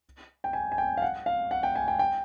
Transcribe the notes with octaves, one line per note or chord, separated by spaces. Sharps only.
G5
G#5
G#5
G5
F5
F#5
F5
F#5
G5
G#5
G5
G5